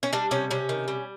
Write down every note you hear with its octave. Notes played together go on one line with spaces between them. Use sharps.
C#4
G3 D4
C3 C#4
C3 C#4
D#3
G3